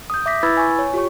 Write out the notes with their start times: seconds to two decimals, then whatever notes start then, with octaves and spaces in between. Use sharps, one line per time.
0.10 D#6 G6
0.26 E5 D6 G6 A#6 B6
0.43 E4 B4 B5 E6 G#6 A6
0.57 G#5 C#6
0.79 C#5
0.94 F4 G4 C#5 C#6